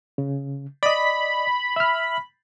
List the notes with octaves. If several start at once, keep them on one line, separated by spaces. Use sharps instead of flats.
C#3
D5 D#5 B5
E5 F6